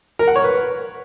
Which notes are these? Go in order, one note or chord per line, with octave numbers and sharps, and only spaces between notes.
A#4
F#5
C#5
B4